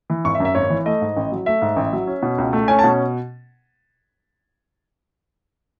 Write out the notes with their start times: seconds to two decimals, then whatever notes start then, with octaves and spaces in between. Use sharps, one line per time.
0.10 E3
0.25 G#1 C#6
0.35 E5
0.40 F#2
0.45 E5
0.55 G#1 C#5
0.70 E3
0.86 A3 D#5
1.01 G#2
1.17 A1
1.32 F#3
1.46 A3 E5
1.62 G#2
1.76 A1
1.93 F#3
2.07 C#4
2.23 B2
2.38 C#2
2.53 A3
2.68 C#4 G#5
2.79 A5
2.84 B2